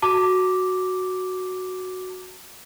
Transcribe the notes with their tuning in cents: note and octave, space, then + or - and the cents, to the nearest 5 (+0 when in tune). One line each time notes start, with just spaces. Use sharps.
F#4 +0 A5 +40 D6 +0